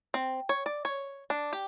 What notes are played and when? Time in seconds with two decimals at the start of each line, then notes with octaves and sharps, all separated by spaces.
0.14 C4
0.49 C#5
0.66 D5
0.85 C#5
1.30 D4
1.53 G4